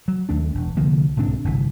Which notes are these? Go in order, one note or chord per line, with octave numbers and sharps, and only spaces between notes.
F#3
D#2 A3 D4
E1
C2 D3 F3 A#3
B1 G#2 C4 D4
G1 C2 E3